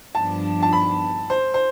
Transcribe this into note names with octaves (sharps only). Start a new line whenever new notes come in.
G2 F3 B3 D4 A5
A5
B5
C5
C5